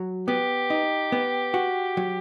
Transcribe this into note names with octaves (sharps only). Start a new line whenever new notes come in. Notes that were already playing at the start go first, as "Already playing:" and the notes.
Already playing: F#3
B3 G4
D#4
B3
F#4
F#3